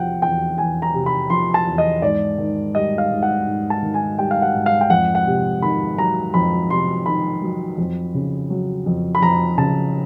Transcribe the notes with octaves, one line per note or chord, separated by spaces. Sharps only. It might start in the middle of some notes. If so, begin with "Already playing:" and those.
Already playing: E2 C3 F3 F#5 G5
E2 G5
E2 G#5
A#5
C3
B5
F3 C6
A5
E2
D#5
G#2 D5
D#3
G3 D#5
F5
G#2
F#5
G#2
A5
D#3
G#5
G3 G5
F5
F#5
G#2
F5
G5
F2 F#5
F#5
C3
D#3 B5
F#3 A#5
F2 B5
C3 C6
D#3 B5
F#3
F2
C#3
F#3
F2
B5
F2 A#5
C#3 A5